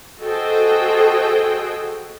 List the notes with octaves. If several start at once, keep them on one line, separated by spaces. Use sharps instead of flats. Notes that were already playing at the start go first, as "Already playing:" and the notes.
F#4 G#4 A4 C5 D#5 G5